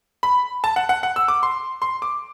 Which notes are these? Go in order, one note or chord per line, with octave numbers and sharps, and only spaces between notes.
B5
A5
F#5
F#5
F#5
E6
D6
C6
C6
D6